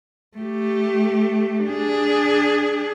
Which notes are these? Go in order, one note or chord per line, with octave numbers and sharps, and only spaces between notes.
A3 G4
D4 G#4